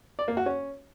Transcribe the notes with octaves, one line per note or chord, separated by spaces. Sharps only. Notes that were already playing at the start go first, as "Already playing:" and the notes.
D5
A#3
F#4
C#4